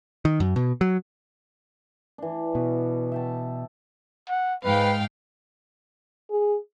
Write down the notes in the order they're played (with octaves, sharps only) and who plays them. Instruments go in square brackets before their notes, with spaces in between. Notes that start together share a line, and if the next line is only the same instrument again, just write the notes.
[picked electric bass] D#3
F#2
B2
F#3
[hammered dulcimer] E3 D4
[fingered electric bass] B2
[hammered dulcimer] E5 G5 A5
[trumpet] F#5
[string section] G#2 F5 G5 [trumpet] B4
[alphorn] G#4